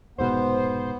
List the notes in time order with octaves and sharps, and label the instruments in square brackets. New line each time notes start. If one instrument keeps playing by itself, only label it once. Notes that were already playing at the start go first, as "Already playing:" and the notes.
[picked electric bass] F1 G#2 B2 [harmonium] B3 [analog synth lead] C5